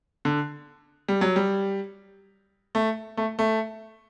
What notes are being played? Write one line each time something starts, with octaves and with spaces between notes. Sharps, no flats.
D3
G3
F#3
G3
A3
A3
A3